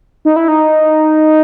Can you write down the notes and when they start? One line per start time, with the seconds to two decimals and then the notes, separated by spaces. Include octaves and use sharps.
0.25 D#4
0.36 E4
0.48 D#4